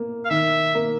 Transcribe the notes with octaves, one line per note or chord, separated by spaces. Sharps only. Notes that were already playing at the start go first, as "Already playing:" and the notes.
Already playing: A#3
F5
D#3 E5
A#3